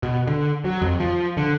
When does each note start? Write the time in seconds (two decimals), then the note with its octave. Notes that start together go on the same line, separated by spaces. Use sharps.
0.03 B2
0.27 D3
0.64 F#3
0.82 F2
1.00 F3
1.37 D3